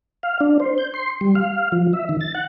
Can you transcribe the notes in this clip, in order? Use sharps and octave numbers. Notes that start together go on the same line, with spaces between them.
F5
D4
C5
G6
C6
G3
F5
F3
E5
D#3
A6
F#5